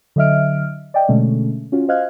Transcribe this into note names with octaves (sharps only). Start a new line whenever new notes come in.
D3 F#3 D#5 E5 F6 D7
D5 D#5 G5
B2 D3 G#3 A3 C#4
C#4 F4 F#4
C5 D#5 F5 F6 F#6 G#6